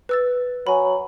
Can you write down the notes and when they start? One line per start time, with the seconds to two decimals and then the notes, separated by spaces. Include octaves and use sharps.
0.09 B4 E6 A6
0.67 F#3 G#5 B5